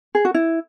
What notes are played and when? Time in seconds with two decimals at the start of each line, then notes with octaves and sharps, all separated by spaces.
0.15 G#4
0.25 F#4
0.34 E4